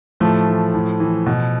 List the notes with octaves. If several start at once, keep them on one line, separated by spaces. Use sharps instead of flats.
A2 F3 A3
E3
A2
E3
B2